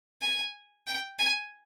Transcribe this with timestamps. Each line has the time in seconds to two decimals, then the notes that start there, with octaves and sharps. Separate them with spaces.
0.22 G#5
0.87 G5
1.19 G#5